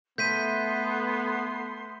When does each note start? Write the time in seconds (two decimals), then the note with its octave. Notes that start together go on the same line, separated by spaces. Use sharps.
0.18 A3 B3 A4 C6 G6 B6 D#7